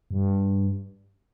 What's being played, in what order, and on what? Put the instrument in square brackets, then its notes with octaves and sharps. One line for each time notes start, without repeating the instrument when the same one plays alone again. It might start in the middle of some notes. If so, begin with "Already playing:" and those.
[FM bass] G2